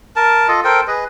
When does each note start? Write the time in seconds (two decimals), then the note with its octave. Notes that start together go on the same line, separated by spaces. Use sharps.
0.16 A#4 A5
0.48 F4 A4 D#5
0.64 A4 A#4 C5 G5
0.88 G#4 B4 D#5